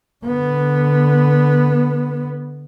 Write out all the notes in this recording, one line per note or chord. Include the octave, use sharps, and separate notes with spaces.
D3 B3